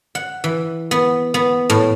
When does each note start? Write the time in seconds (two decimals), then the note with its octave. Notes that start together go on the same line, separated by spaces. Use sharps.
0.15 F#5
0.44 E3
0.91 B3
1.34 B3
1.70 A2